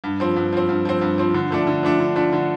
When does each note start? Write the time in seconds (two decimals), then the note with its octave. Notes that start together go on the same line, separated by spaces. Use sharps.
0.04 G2
0.20 F3 C4
0.36 G2
0.53 F3 C4
0.69 G2
0.85 F3 C4
1.01 G2
1.18 F3 C4
1.34 D3
1.51 F3 A3 D4
1.67 D3
1.83 F3 A3 D4
2.00 D3
2.16 F3 A3 D4
2.33 D3